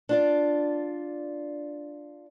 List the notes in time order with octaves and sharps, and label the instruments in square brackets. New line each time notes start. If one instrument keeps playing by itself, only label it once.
[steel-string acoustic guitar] D4 F4 D5